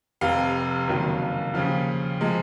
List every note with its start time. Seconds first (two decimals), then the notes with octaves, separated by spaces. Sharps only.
0.21 F1 F2 C3 F5
0.88 F#1 F2 D#3 F#3
1.54 D#2 C#3 F3 F5
2.21 C3 F3 G#3